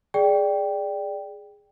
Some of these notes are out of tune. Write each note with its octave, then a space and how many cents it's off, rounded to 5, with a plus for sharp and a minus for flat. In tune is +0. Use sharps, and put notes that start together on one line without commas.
G#4 +0 D5 +0 G5 +0